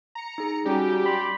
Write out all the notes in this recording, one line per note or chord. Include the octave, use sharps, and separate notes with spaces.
A#5 C#7
D#4 G#4
G3 C#4 F#4 G4
D5 B5 C6